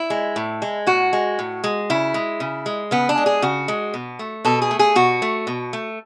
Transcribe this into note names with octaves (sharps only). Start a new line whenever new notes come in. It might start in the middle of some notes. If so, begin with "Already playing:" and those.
Already playing: E4
G#3
A2
G#3
A2 F#4
G#3
A2
G#3
C#3 E4
G#3
C#3
G#3
C#3 B3
D4
G#3
G#4
C#3 F#4
G#3
B2
A3
B2 A4
G#4
A3
G#4
B2 F#4
A3
B2
A3